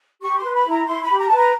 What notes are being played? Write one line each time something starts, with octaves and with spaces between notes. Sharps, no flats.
G4 C#6
C6
B4
B5
E4
A#5
E4 C6
B5
G4
A#5
B4 A5
A#5